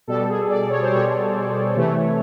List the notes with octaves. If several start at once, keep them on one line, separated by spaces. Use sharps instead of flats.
B2 G3 A4
G#4
D5
C#5
C5
B2 G3 C#5
C3 E3 A3